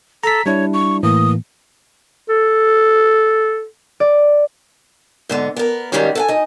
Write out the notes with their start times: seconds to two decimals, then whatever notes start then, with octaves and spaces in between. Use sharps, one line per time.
0.23 A4 A#5 B6
0.46 G3 D4 E4 C#5
0.74 C#6
1.03 A2 E3 A#3 D#6
2.29 A4
4.00 D5
5.29 G#2 D3 B3
5.56 B3 A#4
5.92 G#2 D#3 G3 G#3 C#4 D#4
6.15 A4 F#5 G#5
6.28 D#4 D#5